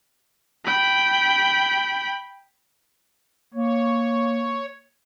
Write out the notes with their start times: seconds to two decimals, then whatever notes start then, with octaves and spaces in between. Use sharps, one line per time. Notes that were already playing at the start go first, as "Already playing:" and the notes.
0.65 G5 B5
3.54 A#3 C#5